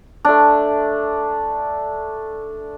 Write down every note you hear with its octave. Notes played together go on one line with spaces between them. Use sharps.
A3 D4